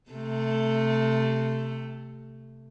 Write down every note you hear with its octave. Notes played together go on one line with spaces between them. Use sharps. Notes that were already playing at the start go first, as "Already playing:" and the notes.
C3 A3